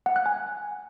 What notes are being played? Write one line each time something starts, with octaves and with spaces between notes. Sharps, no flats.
F#5
F#6
G#5